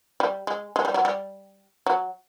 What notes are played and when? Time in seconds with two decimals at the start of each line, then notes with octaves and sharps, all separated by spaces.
0.20 G3
0.47 G#3
0.76 G#3
0.85 G3
0.94 F#3
1.05 G3
1.87 F#3